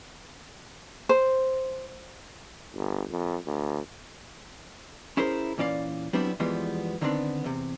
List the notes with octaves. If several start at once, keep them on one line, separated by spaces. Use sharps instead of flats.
C5
G1
F2
D2
C#4 E4 G#4 A#4 C5 C#5
A#2 E3 C#4 D5 F5
F#3 G3 B3 C4 D4 E4
E2 E3 F3 G3 G#3 B3
D3 D#3 G3 B3 C4 D4
E2 C3